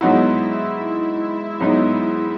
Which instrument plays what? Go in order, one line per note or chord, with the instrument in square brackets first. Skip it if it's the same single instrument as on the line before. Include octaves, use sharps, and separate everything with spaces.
[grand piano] G#2 F#3 B3 D#4 F#4 [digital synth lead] E4
[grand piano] G#2 F#3 B3 D#4